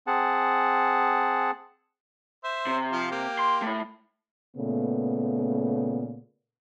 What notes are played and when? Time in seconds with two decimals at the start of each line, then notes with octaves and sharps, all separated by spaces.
0.07 C4 G#4 F#5 A5
2.44 C5 E5
2.67 C3
2.93 F3 F4 F5
3.12 A#3 G4
3.39 C6
3.62 A3 E4
4.56 A#2 C#3 A3 B3